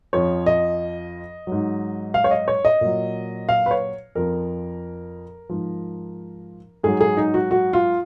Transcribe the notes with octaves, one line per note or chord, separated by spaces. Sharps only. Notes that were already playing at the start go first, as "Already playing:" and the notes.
F2 F3 C#5
D#5
G#2 F#3
F5
C#5
D#5
C#5
D#5
A#2 F#3
F5
B4
C#5
F2 F3 A#4
G#2 F3
G#2 F#3 G#4
G#4
D#4
F#4
F#4
F4